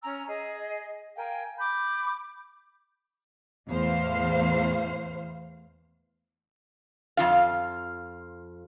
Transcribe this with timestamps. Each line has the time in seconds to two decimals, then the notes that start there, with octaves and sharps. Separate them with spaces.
0.02 C#4 G#5 A#5 E6
0.28 G#4 D#5
1.16 A#4 F5 G5 G#5
1.59 B5 D6 G6
3.68 E2 A2 E3 C5 F5
7.17 F2 F4 F5